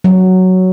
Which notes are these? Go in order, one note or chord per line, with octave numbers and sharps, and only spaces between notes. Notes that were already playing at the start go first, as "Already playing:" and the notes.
F#3